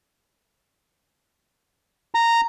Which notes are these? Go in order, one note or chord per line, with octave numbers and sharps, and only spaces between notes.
A#5